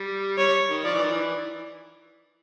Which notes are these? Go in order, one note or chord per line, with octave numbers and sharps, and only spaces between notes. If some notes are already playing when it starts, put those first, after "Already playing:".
Already playing: G3
G3 C#5
D#3
F3 D5
E3
D#3
E3